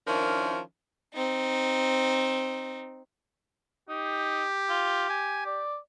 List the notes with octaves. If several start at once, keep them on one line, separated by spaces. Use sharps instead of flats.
D#3 F3 C#4 D4 E4 A#4
C4 D#4
D#4 G4
F4
G#5
D5